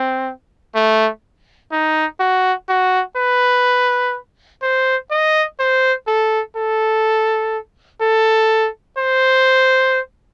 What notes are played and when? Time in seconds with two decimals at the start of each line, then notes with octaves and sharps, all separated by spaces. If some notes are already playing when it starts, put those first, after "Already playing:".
Already playing: C4
0.75 A3
1.72 D#4
2.20 F#4
2.69 F#4
3.17 B4
4.62 C5
5.11 D#5
5.59 C5
6.07 A4
6.56 A4
8.01 A4
8.98 C5